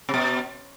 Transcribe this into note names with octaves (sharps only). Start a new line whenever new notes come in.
C3
B2